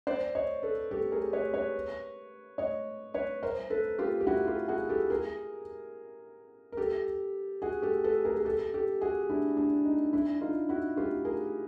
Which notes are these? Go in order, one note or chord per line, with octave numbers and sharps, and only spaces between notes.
C5 D5
C#5 D#5
A4 B4
G4 A4
G#4 A#4
B4 C#5
B4 C#5
C#5 D#5
B4 C#5
A#4 C5
A4 B4
F4 G4
G4
E4 F#4
F4 G4
F#4 G#4
G4 A4
G#4 A#4
A#4
G4 A4
F#4 G#4
G4 A4
A4 B4
G#4 A#4
G#4
G4 A4
G4 A4
F#4 G#4
D4 E4
D4
D#4
D4 E4
D#4 F4
E4 F#4
F4 G4
G#4 A#4